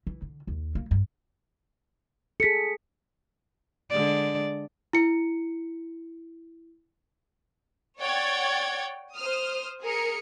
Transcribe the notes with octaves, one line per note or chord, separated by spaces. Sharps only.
E3
D3
D#2
A#3
G2
G#4 A4 B6 C#7
D3 G#3 D5
E4 C#7
C#5 D5 F#5 G5 G#6 A6
C5 D#6 F6
G#4 A#4 C#7